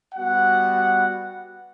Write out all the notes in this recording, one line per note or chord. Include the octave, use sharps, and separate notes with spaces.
G3 B3 F#4 F#5